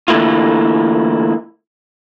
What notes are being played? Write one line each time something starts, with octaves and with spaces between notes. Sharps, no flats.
D3 E3 A3 A#3 E4 F4